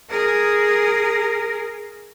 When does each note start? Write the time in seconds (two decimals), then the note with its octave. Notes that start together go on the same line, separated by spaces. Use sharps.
0.10 G#4 A#4